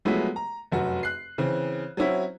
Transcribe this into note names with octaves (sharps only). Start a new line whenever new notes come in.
F3 F#3 G#3 A3 B3 E4
A#5
F1 F#2 F#4
F#6 C7
C#3 E3 C4
F#3 C4 C#4 E4 F#4